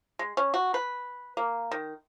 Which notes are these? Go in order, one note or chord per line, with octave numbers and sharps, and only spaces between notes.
G#3
C#4
F#4
B4
A#3
D#3